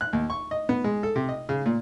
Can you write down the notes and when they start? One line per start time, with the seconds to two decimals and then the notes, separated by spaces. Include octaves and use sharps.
0.01 F#6
0.13 D#2
0.30 C#6
0.51 D#5
0.69 B3
0.84 G#3
1.03 A4
1.16 C3
1.29 D#5
1.49 C#3
1.66 A#2